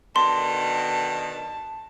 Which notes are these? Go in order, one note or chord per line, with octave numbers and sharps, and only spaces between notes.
B2 D3 D#3 A5 C6